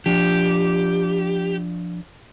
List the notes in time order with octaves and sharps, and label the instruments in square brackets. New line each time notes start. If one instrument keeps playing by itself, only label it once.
[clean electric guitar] F3 D4 F4 [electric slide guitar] G4